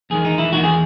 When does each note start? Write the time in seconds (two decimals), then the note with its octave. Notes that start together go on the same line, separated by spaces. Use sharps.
0.10 E2 D#3 G#3 G#4
0.25 D#4
0.38 E4
0.53 E2 D#3 G#3 F#4
0.63 G#4